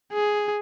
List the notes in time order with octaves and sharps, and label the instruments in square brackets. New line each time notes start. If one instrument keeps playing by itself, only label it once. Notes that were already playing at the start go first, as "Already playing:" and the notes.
[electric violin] G#4